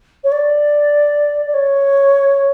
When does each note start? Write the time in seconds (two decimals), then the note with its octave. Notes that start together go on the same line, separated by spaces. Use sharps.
0.24 C#5
0.32 D5
1.46 D5
1.54 C#5